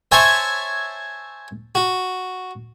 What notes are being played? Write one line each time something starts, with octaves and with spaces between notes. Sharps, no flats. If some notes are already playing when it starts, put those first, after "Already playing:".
C5 C#5 E5 G#5 A5
F#4